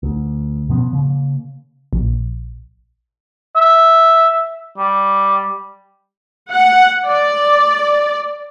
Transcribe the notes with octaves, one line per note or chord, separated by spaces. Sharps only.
D2
B2 F3 B3 C#4
C#3 A#3
A#1
E5
G3
F#5
D5